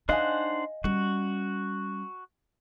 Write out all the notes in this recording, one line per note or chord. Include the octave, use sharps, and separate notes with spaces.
D4 D#4 C5 D#5 F5 F#5 G#5
G3 C#4 F#4